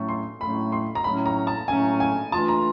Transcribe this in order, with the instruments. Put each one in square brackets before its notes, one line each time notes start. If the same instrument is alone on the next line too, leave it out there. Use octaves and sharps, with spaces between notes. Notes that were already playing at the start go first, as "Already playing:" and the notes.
Already playing: [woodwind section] A2 F#3 A3 C#4
[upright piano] C6
[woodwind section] A2 F#3 A3 C#4 [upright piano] B5
[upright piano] C6
A#5
[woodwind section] A2 F#3 A3 C#4 [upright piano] B5
[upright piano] A#5
A5
[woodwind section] A2 F#3 A3 C#4 [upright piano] G#5
[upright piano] G#5
[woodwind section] E3 A3 D4 F4 [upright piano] A5
[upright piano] A#5